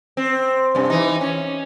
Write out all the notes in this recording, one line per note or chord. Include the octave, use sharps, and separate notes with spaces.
C4
G2 C3
E3 D#4
C#4